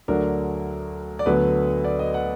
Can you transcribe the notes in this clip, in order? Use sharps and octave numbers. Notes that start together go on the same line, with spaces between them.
D2 D3 F#3 D4 A#4
D5
D2 D3 F#3 B3 B4
D5
D#5
F#5